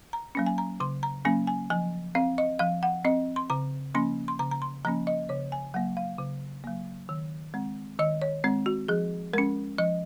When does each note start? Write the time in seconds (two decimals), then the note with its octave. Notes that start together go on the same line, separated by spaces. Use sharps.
0.13 A#5
0.35 F#3 A#3 C#4
0.46 G#5
0.58 A#5
0.80 C#3 C6
1.03 A#5
1.25 F#3 A#3 C#4 G#5
1.47 G#5
1.70 F3 G#5
2.15 C4 F5
2.38 D#5
2.59 F3 F5
2.83 F#5
3.05 C4 D#5
3.36 C6
3.50 C#3 A#5
3.95 F3 A#3 C#4 C6
4.28 C6
4.39 C#3 A#5
4.51 A#5
4.62 C6
4.85 F3 A#3 C#4 A#5
5.07 D#5
5.29 C#3 C#5
5.52 G#5
5.74 F#3 A#3 F#5
5.97 F5
6.19 C#3
6.64 F#3 A#3
7.09 D#3
7.54 G#3 C4
7.99 D#3 D#5
8.22 C#5
8.44 G#3 C4
8.66 F#4
8.88 F3 G#4
9.33 G#3 C#4 A#4
9.78 F3 D#5